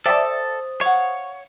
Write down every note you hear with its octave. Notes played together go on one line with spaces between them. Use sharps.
A4 C5 D5 E5 G5 A5 D#6
C#5 F5 F#5